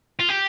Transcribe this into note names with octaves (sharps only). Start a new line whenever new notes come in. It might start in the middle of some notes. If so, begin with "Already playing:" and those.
F4
G4